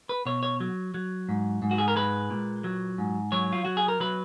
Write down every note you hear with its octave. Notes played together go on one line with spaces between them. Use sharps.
B4
B2 C#5
C#5
F#3
F#3
G#2
G#2
F#4
G#4
A#4
G#3 B4
A#2
F#3
G#2
F#3 C#5
F4
F#3 F#4
G#4
A#4
F#3 B4